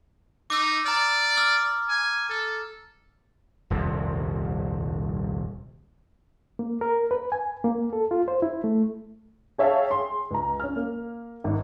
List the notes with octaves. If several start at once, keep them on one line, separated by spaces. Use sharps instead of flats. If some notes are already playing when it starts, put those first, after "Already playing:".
D#4 D6 E6
D5 A#5 F6
D6 E6 F6
G#5
A4
D#1 C2 F2 C3
A#3
A#4
B4
G#5
A#3
A4
F4
C5
E4
A3
G#4 C#5 E5 F5 G5 A5
G#4 C6
C#2 A#5
C#4 F6
A#3
G#1